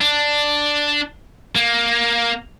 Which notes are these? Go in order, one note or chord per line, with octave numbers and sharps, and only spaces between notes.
D4
A#3